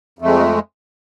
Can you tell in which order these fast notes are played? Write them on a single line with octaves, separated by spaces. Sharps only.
F2 A3 G#3